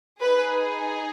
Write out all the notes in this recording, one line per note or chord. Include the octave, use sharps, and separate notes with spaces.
D#4 G#4 B4